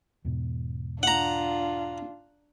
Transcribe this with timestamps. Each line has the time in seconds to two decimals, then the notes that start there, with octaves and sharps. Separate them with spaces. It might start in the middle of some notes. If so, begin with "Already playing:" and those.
0.25 E2 G#2 B2
1.03 D4 F4 F#5 A#5